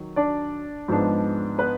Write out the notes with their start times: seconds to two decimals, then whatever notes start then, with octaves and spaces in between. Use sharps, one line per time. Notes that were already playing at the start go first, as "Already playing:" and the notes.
Already playing: D#3 F#3
0.16 D4 D5
0.88 G#2 F3 G#3 B3 D4
1.58 B3 B4